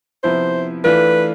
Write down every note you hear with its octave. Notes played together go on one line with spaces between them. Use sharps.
C3 F3 B3 E4 C5
E3 A3 D4 F4 B4